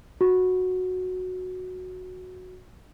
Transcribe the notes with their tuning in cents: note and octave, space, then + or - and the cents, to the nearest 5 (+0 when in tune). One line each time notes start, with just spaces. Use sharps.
F#4 -10